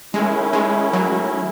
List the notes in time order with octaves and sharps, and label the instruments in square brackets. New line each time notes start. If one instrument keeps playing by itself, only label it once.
[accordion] D#3 A3 C#4 E4 [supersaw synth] G#3
[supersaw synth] G#3
F#3